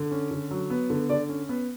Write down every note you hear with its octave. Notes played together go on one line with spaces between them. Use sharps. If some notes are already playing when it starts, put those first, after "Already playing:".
Already playing: D3
C#4
D3
F#3
B3
D3
D3 D5
C#4
B3